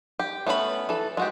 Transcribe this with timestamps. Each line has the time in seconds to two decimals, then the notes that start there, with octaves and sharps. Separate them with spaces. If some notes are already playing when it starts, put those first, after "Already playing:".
0.19 G4
0.47 A3 B3 C#4 D4 B5
0.89 E3 A4
1.17 G#3 F#4 G4